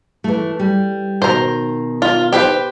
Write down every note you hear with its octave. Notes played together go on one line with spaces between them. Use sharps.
E3 A3
G3
B2 D#3 C5 A#5
F4
G4 B4 C5